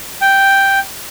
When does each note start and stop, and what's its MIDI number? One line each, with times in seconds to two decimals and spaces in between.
0.21 0.79 79